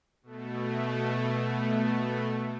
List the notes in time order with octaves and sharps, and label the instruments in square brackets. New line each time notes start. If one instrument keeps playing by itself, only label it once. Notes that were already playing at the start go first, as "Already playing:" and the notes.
[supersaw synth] B2 A3